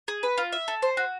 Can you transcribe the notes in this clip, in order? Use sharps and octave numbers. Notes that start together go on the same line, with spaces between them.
G#4
B4
F4
E5
A4
C5
F#4